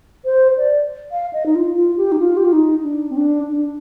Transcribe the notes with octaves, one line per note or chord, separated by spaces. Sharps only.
C5
D5
F5
D#5
D#4
F4
F4
G4
D#4
F4
G4
F4
D#4
D4
C4
D4
D4